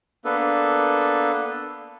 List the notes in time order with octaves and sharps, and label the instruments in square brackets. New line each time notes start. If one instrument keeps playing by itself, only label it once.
[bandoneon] A#3 B3 D4 A4 B4